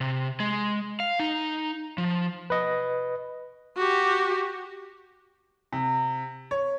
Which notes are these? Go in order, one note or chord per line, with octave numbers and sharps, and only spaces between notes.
C3
G#3
F5
D#4
F3
B4 D#5
F#4 G4
C3
C#5